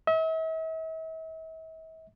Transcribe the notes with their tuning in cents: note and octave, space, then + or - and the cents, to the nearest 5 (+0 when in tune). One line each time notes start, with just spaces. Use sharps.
E5 -45